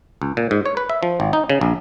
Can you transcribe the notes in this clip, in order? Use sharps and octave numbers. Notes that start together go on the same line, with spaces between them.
C#2
A#2
G#2
C#5
B4
E5
F3
G#1
D#4
C#3
A#1